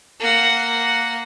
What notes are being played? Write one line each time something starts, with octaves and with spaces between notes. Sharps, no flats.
A#3 F#5